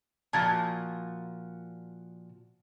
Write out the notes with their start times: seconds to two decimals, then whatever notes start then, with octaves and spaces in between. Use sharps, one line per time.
0.33 A#2 F3 F#4 A5 G#6 A6